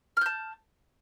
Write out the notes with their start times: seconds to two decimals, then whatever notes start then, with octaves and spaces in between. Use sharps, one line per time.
0.17 F6
0.21 G6
0.26 A5